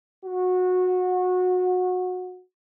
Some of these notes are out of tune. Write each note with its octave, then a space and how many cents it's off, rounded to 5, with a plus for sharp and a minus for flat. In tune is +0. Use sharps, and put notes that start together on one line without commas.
F#4 -20